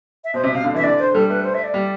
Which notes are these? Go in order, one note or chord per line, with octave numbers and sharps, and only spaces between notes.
E5
B2 C5
C3 E5
C3 F5
D3
E3 E5
D3 D5
C5
G3 A4
A3 B4
C5
E5
D5
G3